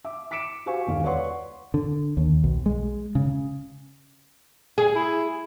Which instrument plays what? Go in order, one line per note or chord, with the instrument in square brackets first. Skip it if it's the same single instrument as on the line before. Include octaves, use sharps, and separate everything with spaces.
[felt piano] E5 D6
D6 B6 C#7 D7 E7
F#4 G4 C5 F5 G#5 C#6
E1 D2 D#3 F5
B4 C#5 D5 F#5 C6 C#6
[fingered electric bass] D3
D#2
B1
G#3
C#3
[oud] G#4
[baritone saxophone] E4